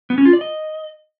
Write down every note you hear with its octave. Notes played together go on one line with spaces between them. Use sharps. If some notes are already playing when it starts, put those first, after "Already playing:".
B3
C#4
F4
D5
D#5